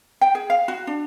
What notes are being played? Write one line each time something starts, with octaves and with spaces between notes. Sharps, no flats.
G5
G#4
F5
F#4
D4